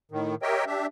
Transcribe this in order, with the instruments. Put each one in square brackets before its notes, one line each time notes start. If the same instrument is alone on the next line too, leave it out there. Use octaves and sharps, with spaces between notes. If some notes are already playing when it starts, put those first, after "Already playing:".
[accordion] A2 D#3
G4 A#4 C#5 D#5 E5 G5
D4 G4 E5